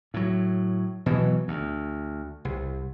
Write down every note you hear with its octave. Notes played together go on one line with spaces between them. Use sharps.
A2 F#3
B2 E3 F#3
D2
C2